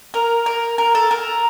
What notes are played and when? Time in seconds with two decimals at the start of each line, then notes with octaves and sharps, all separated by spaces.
0.14 A#4
0.46 A#4
0.78 A#4
0.95 A4
1.11 A#4